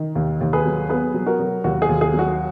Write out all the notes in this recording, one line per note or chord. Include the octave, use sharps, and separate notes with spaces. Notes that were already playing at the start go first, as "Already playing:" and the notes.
Already playing: D#3
D#2
D#2
G#4 B4
F#3
B3 G#4 B4
F#3
F#4 A#4
F#3
D#2 F#4
G#4
D#2
G#4
F#3
F#4